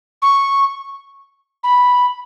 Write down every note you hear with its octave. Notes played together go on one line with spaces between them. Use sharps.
C#6
B5